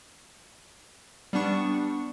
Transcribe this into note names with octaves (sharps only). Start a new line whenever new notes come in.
G3 B3 D4 C#6 C#7